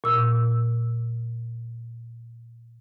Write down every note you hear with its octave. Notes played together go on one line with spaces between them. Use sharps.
A#2 E6